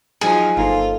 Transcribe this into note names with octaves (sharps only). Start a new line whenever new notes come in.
F3 F#3 D#4 G#4
G1 A#3 C4 D#4 F4 A4